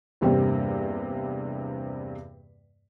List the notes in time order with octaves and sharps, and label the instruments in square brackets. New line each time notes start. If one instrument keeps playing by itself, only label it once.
[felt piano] E2 G2 C3 G3 A#3 C4